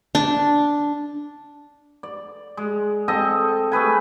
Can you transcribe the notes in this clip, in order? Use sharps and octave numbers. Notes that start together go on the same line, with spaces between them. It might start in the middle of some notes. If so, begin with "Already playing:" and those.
D4
D5
G#3
C4 A4 D#5 A5
A3 G#4 B4 G#5